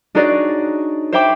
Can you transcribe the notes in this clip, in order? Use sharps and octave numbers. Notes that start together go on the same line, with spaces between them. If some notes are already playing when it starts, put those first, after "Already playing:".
D4 D#4 F#4 G#4 C#5 D5
C5 C#5 E5 G5 B5 D6